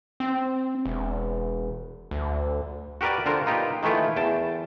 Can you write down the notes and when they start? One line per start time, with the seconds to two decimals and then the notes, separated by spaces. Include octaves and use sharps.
0.20 C4
0.86 E1
2.11 D2
3.01 F#4 G4 A#4 B4 D5
3.26 D3 F4 A#4 C5
3.46 A#3 D#4 F4 G4 B4
3.83 D#3 E3 A3 E4 F4
4.16 E2 G5 A5